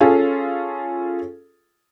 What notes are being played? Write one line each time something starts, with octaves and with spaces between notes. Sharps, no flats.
C#4 F4 G#4 A4